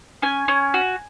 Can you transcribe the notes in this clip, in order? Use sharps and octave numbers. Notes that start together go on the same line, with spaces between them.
C#4 G#5
C#4
F#4